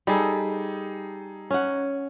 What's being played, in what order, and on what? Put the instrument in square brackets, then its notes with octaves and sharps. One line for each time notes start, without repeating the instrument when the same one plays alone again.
[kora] G3 [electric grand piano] D#4 G#4 A4
[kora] C#4 F#5